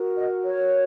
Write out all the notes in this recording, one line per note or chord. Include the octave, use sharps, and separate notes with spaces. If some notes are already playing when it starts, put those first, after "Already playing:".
Already playing: F#4 A#4
D#5
C#5